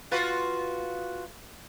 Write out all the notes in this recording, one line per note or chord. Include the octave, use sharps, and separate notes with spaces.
F4 F#4 B4